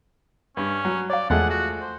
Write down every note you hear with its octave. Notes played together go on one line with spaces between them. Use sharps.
G2 C#4
F#3
C#5 D5 F5
E2 F3 G#3 A3 F#5
F#4
C5